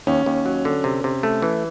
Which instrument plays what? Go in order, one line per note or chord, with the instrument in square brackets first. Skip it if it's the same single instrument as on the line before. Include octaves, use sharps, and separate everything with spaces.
[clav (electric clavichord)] D#2 [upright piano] C#4
[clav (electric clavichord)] D#2
F#3
D3
C3
C3
A3
E3